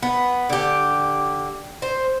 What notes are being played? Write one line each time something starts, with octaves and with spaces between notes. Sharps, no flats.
B3
D3 G4
C5